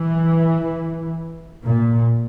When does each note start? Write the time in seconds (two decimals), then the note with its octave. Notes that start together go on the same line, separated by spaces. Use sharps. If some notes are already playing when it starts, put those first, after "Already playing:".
Already playing: E3
1.65 A#2